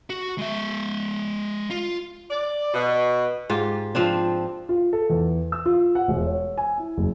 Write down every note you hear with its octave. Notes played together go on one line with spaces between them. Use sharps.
F#4
G#3 E5
F4
D5
B2
G#2 F4 G4
F3 C4 D4
F4
A4
E2
E6
F4
F#5
E1
C#5
G#5
E4
F#1